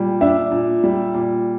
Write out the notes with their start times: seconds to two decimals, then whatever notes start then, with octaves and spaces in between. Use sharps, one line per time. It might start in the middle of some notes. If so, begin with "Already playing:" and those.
Already playing: A#2 G3
0.21 D4 E5
0.52 A#2
0.84 G3
1.14 A#2